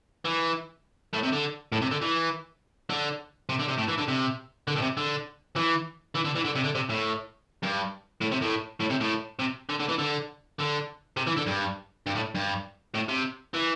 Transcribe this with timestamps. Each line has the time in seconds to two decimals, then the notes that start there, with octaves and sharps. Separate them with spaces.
0.25 E3
1.13 A2
1.23 C3
1.32 D3
1.72 A2
1.82 C3
1.92 D3
2.02 E3
2.90 D3
3.49 C3
3.60 D3
3.69 C3
3.79 A2
3.89 E3
3.99 D3
4.09 C3
4.68 D3
4.76 A2
4.82 C3
4.97 D3
5.56 E3
6.15 E3
6.25 D3
6.35 E3
6.45 D3
6.55 C3
6.64 D3
6.75 C3
6.90 A2
7.63 G2
8.21 A2
8.32 C3
8.42 A2
8.80 A2
8.90 C3
9.01 A2
9.39 C3
9.70 D3
9.80 D3
9.89 E3
9.99 D3
10.59 D3
11.17 C3
11.27 E3
11.37 D3
11.47 G2
12.06 G2
12.15 A2
12.35 G2
12.95 A2
13.09 C3
13.54 E3